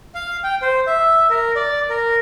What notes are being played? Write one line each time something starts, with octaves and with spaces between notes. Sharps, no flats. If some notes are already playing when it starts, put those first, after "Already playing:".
F5
G5
C5
E5
A#4
D5
A#4